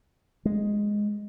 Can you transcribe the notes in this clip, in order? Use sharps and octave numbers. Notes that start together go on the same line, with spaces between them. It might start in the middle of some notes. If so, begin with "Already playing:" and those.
G#3